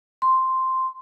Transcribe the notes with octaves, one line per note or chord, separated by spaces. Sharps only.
C6